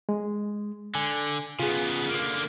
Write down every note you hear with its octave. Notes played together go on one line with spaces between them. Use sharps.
G#3
D3 G#5
C#3 B3 F4 G#4
D3 A#3